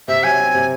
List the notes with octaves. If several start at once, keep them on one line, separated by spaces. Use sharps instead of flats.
C3 E5
F#3 G#5
C4
C3